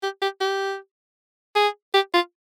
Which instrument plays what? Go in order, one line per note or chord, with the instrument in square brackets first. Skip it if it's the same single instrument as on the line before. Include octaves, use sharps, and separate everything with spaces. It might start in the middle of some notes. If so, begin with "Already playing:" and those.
[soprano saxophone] G4
G4
G4
G#4
G4
F4